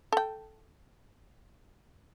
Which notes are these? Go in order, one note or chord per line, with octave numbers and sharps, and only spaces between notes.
A4 G5